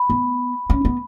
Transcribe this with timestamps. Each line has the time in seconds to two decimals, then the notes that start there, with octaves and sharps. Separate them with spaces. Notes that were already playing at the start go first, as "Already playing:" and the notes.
Already playing: B5
0.10 B3
0.70 C#4
0.85 B3